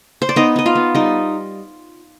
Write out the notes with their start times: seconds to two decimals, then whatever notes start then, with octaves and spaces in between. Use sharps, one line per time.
0.22 C5
0.29 D5
0.36 B3 D#4 D#5
0.56 D#4 D#5
0.66 F4 F5
0.75 B3
0.94 G3 D#4 D#5